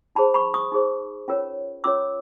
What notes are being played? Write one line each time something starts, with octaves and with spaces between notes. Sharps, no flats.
D#4 G#4 C5 A5 B5
B5 C#6
C#6 D#6
D#4 G#4 C5
C#4 F4 A#4 C#5
C#4 F4 A#4 C#5 D6 E6